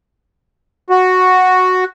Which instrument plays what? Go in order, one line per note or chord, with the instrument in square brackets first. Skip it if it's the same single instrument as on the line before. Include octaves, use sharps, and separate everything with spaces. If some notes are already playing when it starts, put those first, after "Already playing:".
[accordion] F#4